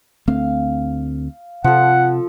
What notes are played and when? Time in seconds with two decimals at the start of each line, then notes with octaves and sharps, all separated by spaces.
0.28 D2 A3 C4 F5
1.64 C3 F3 A4 F#5